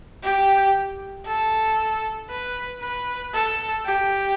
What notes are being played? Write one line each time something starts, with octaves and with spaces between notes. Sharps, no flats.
G4
A4
B4
B4
A4
G4